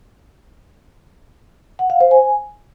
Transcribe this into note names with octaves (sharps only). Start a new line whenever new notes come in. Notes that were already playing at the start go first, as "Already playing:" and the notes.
F#5
F5
C5
G#5